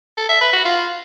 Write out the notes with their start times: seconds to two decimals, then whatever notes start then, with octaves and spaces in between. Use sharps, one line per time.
0.17 A4
0.29 E5
0.41 B4
0.53 F#4
0.65 F4